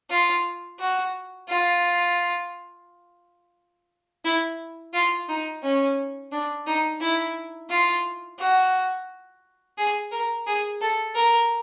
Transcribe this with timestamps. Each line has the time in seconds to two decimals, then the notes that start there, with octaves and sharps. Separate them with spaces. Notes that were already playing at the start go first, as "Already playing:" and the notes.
0.10 F4
0.79 F#4
1.48 F4
4.25 E4
4.93 F4
5.29 D#4
5.63 C#4
6.32 D4
6.67 D#4
7.01 E4
7.70 F4
8.39 F#4
9.78 G#4
10.11 A#4
10.47 G#4
10.81 A4
11.15 A#4